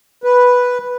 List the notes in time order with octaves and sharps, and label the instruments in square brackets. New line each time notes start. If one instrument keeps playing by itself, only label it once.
[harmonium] B4